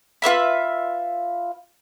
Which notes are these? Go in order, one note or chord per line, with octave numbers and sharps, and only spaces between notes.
F4 B4 E5 B5